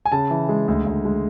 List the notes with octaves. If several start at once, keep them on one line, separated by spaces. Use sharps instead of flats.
G#5
C#3 A5
E3
G#3
D2
D2
G#3